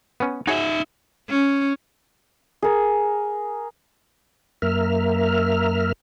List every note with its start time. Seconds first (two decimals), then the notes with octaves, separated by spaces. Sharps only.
0.20 B3 C#4
0.47 D#4 F#4 G#4 C#5 E5
1.29 C#4
2.62 G#4 A#4
4.62 F#2 A#3 A#4 E5 F6